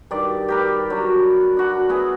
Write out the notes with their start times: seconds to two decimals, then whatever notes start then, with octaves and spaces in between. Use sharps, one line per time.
0.11 G2 D#3 D5
0.48 G4 A#4 B4
0.90 F#3 D4
1.57 D4 F#4
1.89 B3 E4 G#4